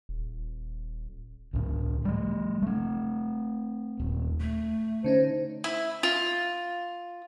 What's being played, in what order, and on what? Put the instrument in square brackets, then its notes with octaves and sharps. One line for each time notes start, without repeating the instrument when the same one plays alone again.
[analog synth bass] D#1
[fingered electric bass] C#2 A2
G3 A3
A3 C4
D#1
[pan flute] A3
[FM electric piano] D3 C#4 D#4 [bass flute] C5
[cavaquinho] E4
F4